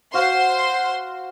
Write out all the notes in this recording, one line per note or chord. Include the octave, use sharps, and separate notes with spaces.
F#4 C5 F5 F#5 C6